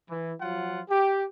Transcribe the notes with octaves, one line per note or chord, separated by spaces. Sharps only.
E3
F3 F#3 F4 F#5
G4